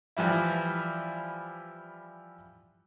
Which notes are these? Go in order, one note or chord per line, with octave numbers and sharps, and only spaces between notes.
E3 F3 G3 E4